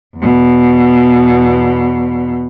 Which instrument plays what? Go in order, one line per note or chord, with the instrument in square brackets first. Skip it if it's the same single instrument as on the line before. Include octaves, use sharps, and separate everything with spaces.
[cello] E2 B2